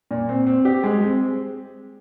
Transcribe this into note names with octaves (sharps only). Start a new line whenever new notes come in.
A#2
C4
C4
G4
G#3
C4